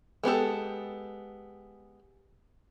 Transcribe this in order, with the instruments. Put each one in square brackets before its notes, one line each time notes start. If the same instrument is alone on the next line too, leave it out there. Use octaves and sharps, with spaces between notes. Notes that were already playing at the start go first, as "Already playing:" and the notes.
[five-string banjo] G#3 B3 G4 A4